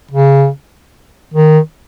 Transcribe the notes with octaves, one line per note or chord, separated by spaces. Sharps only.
C#3
D#3